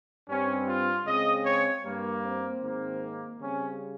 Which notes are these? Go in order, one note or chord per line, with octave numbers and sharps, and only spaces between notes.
G2 G3 C4 C#4
F4
C#3 G#3 C4 D#5
C#5
G2 G3 A#3
C4
G#2 D#3 A#3
C#3 G3 C4 C#4